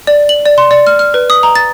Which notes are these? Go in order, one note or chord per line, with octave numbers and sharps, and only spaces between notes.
D5
F#7
D5
C6
D5
F6
F6
B4
D#6
A#5
A6